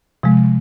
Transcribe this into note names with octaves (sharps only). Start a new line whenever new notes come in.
C3 F3 G#3